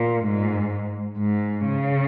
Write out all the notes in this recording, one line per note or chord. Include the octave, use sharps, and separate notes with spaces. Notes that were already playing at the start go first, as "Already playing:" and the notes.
Already playing: A#2
G#2
G#2
C#3